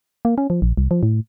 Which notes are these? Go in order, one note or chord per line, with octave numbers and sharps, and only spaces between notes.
A#3
C#4
F3
A#1
C2
F3
A2